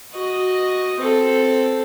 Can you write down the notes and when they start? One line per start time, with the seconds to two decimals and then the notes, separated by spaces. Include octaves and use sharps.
0.14 F#4 D#5
1.00 C4 A4